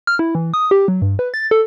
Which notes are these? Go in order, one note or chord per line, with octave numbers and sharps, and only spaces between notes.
F6
E4
E3
D#6
G4
F#3
G2
B4
A6
A4